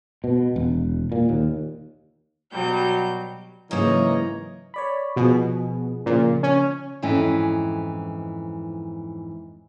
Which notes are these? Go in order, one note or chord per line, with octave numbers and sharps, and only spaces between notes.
B2
E1
A#2
D#2
B2 F#3 G3 G6
G#2 C#3 E3 F#3 A#3 C#5 D#5 A#5
C#5 D5 B5
B2 F3 G#4
A#2 C#3 F3
C#4
F2 G#2 E3 C#4